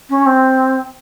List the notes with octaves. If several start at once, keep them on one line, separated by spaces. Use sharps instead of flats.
C#4
C4